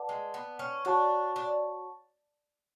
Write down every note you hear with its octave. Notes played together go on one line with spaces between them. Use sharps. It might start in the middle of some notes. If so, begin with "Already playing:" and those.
Already playing: B4 D5 F#5 A5 D6
G#3
B3
C#4
D4 F#4 C#5 F#5 A5 C#6
D4